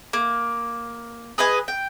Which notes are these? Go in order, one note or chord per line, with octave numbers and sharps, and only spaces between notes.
A#3
G#4 B4 D#5 G#5
G5